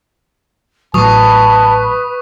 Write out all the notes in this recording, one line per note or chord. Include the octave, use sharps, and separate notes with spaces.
A1 A2 F#3 B4 A5 C#6 D#6